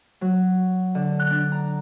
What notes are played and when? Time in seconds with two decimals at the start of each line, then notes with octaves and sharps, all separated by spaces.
0.21 F#3
0.95 D3
1.19 F#6
1.31 D4
1.52 A#5